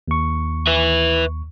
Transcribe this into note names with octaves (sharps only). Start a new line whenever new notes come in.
D#2 C#6
B4 E5